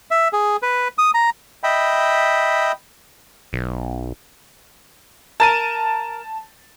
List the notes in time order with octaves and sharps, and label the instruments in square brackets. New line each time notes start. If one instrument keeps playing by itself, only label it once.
[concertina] E5
G#4
B4
D#6
A#5
D#5 E5 G5 B5
[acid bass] B1
[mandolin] A#4 [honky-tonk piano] A5 A6 D#7